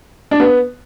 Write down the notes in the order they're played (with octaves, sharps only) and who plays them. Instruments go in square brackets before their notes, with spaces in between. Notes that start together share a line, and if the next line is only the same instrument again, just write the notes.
[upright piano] D4
B3